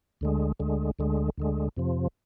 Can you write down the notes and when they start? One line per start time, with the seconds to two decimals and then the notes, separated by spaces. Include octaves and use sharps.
0.21 D2 D3 G#3
0.60 D2 D3 G#3
0.99 D2 D3 G#3
1.38 D2 D3 G#3
1.77 F2 C3 F3